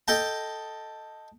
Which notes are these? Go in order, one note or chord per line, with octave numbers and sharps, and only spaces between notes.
A4 D#5 G5 A5